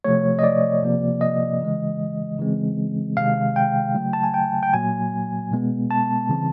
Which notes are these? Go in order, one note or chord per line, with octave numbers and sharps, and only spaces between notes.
C3 F3 A3 C#5
D#5
D5
C3 F3 A#3
D#5
C#3 E3 G#3
C#3 E3 G#3 C4
C3 D#3 G#3 F5
G5
C#3 F#3 A3
A5
G#5
G5
G5
A#2 F#3 A#3 G#5
B2 G#3 B3
A5
C#3 E3 G3 C4